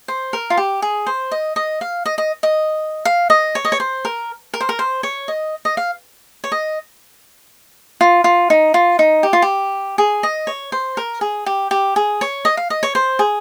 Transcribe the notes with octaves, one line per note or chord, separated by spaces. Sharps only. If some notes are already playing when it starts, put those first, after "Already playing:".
C5
A#4
F4
G4
G#4
C5
D#5
D#5
F5
D#5
D#5
D#5
F5
D#5
C#5
D#5
C#5
C5
A#4
A#4
C5
A#4
C5
C#5
D#5
D#5
F5
C#5
D#5
F4
F4
D#4
F4
D#4
G4
F4
G4
G#4
D#5
C#5
C5
A#4
G#4
G4
G4
G#4
C#5
D#5
F5
D#5
C#5
C5
G#4